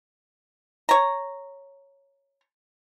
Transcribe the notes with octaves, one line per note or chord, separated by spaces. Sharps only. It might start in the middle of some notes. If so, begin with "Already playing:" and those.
C#5 A#5